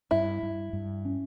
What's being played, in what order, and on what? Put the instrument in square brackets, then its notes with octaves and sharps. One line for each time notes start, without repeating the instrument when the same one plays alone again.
[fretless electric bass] G2 [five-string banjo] E4
[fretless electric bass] G2
G2
C#4